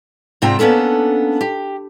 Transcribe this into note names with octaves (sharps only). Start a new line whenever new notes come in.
G#2 C3 C4 F4 G5 A#5
A#3 B3 C#4 D4 A4
G4